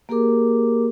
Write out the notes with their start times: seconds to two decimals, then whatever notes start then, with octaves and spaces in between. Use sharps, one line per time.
0.09 A#3 G4 G#4 A#4 D6